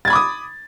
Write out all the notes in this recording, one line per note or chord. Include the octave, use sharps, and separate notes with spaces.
B5 D6 D#6 G#6 A6